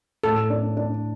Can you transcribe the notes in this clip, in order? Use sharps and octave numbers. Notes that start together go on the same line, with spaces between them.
A2 A4
D4
D4